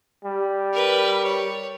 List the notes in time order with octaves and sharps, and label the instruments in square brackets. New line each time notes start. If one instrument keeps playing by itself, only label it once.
[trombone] G3
[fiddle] A#4 B4
C#5